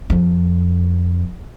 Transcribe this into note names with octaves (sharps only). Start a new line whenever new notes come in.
F2